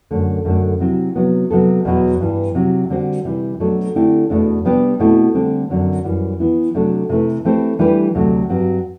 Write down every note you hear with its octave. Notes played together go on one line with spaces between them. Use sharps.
F#2 D3 A3
F#2 D3 A3 D4
C3 F#3 C4 E4
C3 F#3 B3
C3 F#3 B3 F#4 A4
E2 B2 F#3
G2 E3 G3
C3 F#3 C4
D3 G3 C4 F#4 C5
C3 E3 G3
B2 F#3 A3 D4 A4
D3 A3 C4 E4 G4
E2 B2 A3 D4
C3 G3 B3 D4 G4
B2 A3 C4 E4
D3 G3 C4
F#2 D3 F#3 C4
F#2 E3 G3
E3 B3 E4
C3 F#3 A3 D4 A4
C3 E3 A3 E4 B4
E3 A3 C4 G4 C5
E3 G3 D4 G4 B4
D2 C3 F#3 A3
G2 F#3 C4 G4